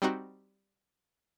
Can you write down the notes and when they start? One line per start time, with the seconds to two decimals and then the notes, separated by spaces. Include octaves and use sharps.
0.02 G3 C4 D#4 F#4